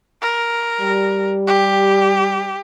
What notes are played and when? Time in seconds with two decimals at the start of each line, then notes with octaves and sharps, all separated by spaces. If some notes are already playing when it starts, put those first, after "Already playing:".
0.22 A#4
0.80 G3
1.47 G4